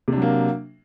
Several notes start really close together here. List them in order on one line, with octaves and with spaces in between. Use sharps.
C3 D4 F#3 A#3